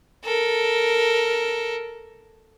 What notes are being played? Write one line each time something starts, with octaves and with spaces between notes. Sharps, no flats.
A4 A#4